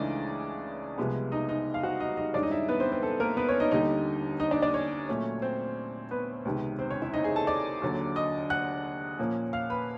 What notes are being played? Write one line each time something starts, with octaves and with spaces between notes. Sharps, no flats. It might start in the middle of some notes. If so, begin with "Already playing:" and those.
Already playing: C#2 C#3 E3 A3 D4 D#4 D5 D#5
C2 C3 F3 G#3 B3
D#4 D#5
D#4 D#5
F5
F#4 F#5
D#4 D#5
D#4 D#5
G2 D#3 G#3 C#4 D4 D5
D#4 D#5
E4 E5
B3 B4
C4 C5
C4 C5
A4
A#3 A#4
B3 B4
C#4 C#5
D#4 D#5
D#2 D3 G3 D#4 D#5
D#4 D#5
D4 D5
D4 D5
C#4 C#5
A#2 F#3 A3 C#4
C4 C5
B3 B4
C#2 C3 D#3
C4 C5
C#4 C#5
E4 E5
D#4 D#5
G#4 G#5
A4 A5
D5 D6
D#2 D3 F#3
D#5 D#6
F#5 F#6
A#2 F3 A#3 C#4
F5 F6
B4 B5